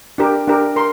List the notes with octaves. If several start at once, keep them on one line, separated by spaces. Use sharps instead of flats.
D4 G4 A#4
D4 G4 A#4
A#4 C6